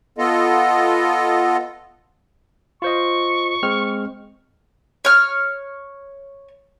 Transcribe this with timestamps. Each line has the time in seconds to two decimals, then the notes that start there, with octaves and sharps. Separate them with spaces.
0.18 B3 F4 A4 D#5
2.82 F4 C5 D#5 C#6
3.63 G#3 C4 F6
5.05 C#5 F6